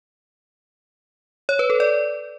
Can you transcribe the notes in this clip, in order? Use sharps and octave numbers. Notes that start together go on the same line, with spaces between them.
C#5
B4
A4
D5